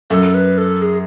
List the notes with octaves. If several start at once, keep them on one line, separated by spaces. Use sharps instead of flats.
F#2 A4
B4
A4
G#4